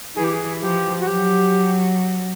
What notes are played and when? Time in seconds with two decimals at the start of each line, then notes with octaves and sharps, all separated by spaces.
0.16 E3 G#4
0.24 G4
0.32 G#4
0.61 F3 G4
0.99 F#4
1.07 F#3 G4